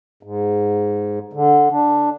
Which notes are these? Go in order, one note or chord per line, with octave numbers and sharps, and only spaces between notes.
G#2
D3
D4